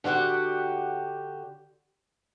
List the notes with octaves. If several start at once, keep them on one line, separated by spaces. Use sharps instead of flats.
D3 D4 F#4 G4 F#5